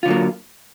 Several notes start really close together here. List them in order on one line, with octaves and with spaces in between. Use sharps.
F4 D3 F#3 A#3